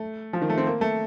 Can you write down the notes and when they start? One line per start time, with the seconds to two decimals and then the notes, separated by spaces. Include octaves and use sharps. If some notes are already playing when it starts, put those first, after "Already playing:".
Already playing: A3
0.33 F3
0.41 D#3
0.50 A3
0.57 C4
0.66 A#3
0.81 A3